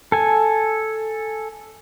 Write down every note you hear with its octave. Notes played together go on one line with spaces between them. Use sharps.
A4 G#5